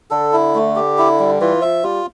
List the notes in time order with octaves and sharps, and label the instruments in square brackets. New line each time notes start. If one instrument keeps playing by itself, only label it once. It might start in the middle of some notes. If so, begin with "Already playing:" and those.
[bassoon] D3 [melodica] A4
[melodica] E4
A3
G4
E4
G3
[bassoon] E3 [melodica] F4
[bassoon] F3 [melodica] E5
[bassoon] G3 [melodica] F4